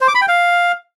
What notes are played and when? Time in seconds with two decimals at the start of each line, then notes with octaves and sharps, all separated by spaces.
0.01 C5
0.08 D6
0.15 B5
0.21 G5
0.28 F5